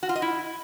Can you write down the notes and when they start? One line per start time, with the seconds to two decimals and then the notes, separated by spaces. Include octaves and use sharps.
0.03 F#4
0.09 F4
0.16 D#5
0.22 E4